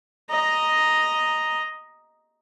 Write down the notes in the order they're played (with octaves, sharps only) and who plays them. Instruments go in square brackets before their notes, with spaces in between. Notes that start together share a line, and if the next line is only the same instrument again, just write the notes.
[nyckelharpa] D#5 A#5